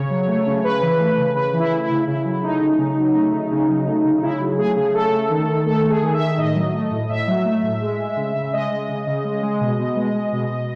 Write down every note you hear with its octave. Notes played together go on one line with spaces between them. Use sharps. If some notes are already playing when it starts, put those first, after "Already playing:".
Already playing: C#3 C#5
F#3
A3
C#3
C#3 B4
E3
A3
C#3
C#3 B4
E3
E4
A3
E4
C#3
C#3 E4
F#3
A3 D#4
C#3
C#3
F#3
A3
C#3
C#3
F#3
A3
C#3
C#3 E4
F#3
A3 G#4
C#3 G#4
A3 A4
A3
D#3
D#3
A3 A4
A3
G#4
D#3
E5
D#3
A2 D#5
F#3
A3
A2
A2 E5
F#3
A3
A2
G#3
G#3
C#3
C#3
G#3 D#5
G#3
C#3
C#3
G#3
G#3
B2
B2
G#3
G#3
B2
B2